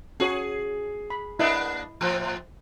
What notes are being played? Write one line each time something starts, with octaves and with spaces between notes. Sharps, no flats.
C#4 F#4 G#4 C#5
B5
A#3 B3 D4 E4 D#5
A2 F3 C4